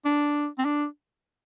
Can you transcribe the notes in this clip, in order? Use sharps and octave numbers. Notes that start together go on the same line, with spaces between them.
D4
C4
D4